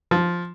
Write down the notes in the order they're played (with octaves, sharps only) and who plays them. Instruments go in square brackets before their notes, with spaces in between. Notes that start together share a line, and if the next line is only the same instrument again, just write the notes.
[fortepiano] F3